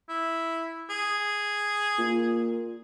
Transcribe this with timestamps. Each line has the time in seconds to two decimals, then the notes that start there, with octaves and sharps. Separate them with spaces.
0.09 E4
0.90 G#4
1.98 A#2